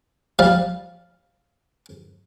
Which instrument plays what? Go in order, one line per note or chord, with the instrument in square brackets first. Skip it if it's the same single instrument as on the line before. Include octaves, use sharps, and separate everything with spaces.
[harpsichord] F3 G3 F5